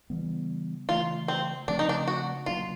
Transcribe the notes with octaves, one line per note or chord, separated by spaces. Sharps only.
C#3 E3 G3 B3
C#3 E3 A3 F4
C4
C#3 F3 A3 C4 D4
D#4
D4
F#4
C#3 F#3 A#3 D4 F4